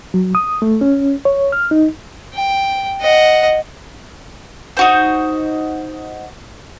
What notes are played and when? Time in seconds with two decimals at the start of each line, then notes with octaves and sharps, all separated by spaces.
0.14 F#3
0.35 D#6
0.62 A3
0.81 C#4
1.25 C#5
1.52 F6
1.71 D#4
2.34 G5
3.01 D#5 F#5
4.77 D#4 F#4 C5